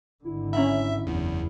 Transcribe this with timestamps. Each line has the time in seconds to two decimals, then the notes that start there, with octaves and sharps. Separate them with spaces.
0.24 G#1 D3 E4
0.53 C#4 E5 A#5 B5
1.07 F#1 E2 E4